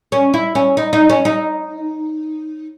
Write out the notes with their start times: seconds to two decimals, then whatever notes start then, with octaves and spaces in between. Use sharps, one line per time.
0.12 C#4
0.34 E4
0.55 C#4
0.77 D#4
0.93 D#4
1.09 C#4
1.25 D#4